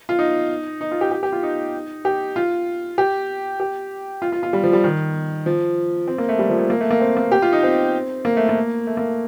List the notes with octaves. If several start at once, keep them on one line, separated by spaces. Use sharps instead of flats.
F4
D#4
D#4
F4
G4
G4
G4
F4
D#4
G4
F4
G4
G4
F4
F4
F4
G3
F3
G3
D#3
F3
C4
A#3
A3
G3
F3
A3
A#3
A3
A#3
C4
A#3
G4
F4
D#4
C4
A#3
A3
A#3
A3
A#3